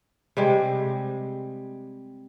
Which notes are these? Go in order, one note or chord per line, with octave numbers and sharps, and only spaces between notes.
C3 G3 G#3